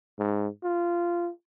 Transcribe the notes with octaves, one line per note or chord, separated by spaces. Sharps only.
G#2
F4